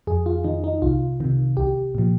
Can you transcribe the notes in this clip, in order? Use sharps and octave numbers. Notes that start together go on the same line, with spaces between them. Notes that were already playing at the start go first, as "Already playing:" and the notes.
F2 G#4
F4
D#3 D#4
D#4
C2 F4
C3 D#3
C2 G4
A#2 F3